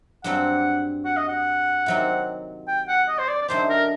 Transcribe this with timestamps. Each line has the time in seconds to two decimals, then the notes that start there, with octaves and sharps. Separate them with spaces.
0.24 G2 F#3 C4 G4 F#5
1.05 F#5
1.17 D#5
1.28 F#5
1.86 C3 D#3 F#3 C4 G4
2.68 G5
2.88 F#5
3.08 D#5
3.18 C5
3.28 D5
3.41 D5
3.48 F#2 D3 A3 D#4 G4 C5
3.70 A#4